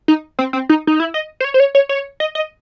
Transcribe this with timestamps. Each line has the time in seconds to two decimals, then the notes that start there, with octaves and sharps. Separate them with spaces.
0.08 D#4
0.39 C4
0.53 C4
0.69 D#4
0.87 D#4
1.00 E4
1.14 D#5
1.40 C5
1.44 C#5
1.54 C5
1.60 C#5
1.75 C#5
1.89 C#5
2.20 D#5
2.35 D#5